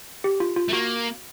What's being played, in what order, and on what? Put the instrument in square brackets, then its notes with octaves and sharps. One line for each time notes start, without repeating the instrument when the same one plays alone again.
[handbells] G4
F4
F4
[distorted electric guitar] A3
[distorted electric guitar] A#3 [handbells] F#4